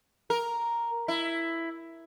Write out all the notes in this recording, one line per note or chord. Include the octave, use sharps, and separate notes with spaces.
A#4
E4